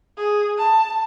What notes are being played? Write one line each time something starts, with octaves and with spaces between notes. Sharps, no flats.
G#4
A5